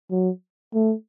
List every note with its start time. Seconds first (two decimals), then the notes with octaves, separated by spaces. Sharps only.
0.11 F#3
0.74 A3